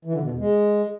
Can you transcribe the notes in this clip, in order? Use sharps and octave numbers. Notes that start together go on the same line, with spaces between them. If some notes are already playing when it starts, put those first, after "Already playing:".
E3
D3
B2
E2
G#3